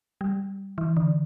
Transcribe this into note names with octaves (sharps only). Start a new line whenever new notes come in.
G3
E3
D3